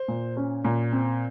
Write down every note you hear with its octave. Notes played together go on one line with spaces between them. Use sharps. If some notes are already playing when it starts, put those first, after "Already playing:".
Already playing: C5
A#2
C#4
A#2
C4